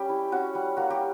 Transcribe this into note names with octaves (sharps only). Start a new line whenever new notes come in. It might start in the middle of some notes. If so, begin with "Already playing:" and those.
Already playing: G3 C#4 G4
E4
C#4 F#4
G3
A#3 F#4
G4